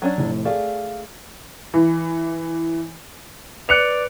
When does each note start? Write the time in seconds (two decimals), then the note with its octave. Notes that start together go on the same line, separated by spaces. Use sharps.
0.02 F#3 C#4 D4
0.18 F1 A2
0.45 A3 G#4 D5 F5
1.74 E3
3.69 B4 D5 F#6 C#7 D7 F7